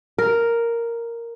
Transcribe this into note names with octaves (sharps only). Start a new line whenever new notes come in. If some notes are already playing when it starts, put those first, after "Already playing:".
A#4